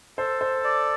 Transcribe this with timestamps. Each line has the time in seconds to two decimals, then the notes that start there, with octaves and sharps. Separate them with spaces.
0.18 A4 C5
0.41 C5
0.64 D5